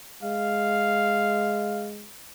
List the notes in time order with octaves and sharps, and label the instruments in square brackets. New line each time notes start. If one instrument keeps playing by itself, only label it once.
[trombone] G#3 [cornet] F5